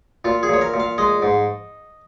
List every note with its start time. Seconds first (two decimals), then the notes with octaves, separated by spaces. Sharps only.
0.25 A#2 F4
0.43 G#4
0.49 A#2 C#5
0.61 A#4
0.74 A#2
0.80 F5
0.98 G#3 D#5
1.22 G#2